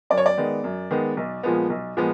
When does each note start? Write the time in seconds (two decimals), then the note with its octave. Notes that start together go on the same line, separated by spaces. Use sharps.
0.10 F#2 D5
0.17 C#5
0.26 D5
0.37 D#3 G#3 B3
0.64 F#2
0.91 D#3 G#3 B3
1.17 B1
1.43 A#2 F3 G#3 B3
1.70 B1
1.97 A#2 F3 G#3 B3